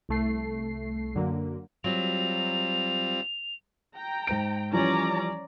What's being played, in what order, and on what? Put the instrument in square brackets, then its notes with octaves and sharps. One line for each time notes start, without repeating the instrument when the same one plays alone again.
[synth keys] C2 A3 C7
F#2 D3 F#3 A#3
[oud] F#3 [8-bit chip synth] G3 C4 F4 [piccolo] F7
[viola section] G5 A#5
[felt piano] G#2 C5 D7
[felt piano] E3 F3 G3 [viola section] C#4 D5 A#5